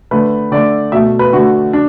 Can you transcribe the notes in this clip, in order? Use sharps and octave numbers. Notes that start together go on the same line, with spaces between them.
D3 A3 B4
D3 A3 D5
B2 A3 E5
B4
D3 A3 F#4
D4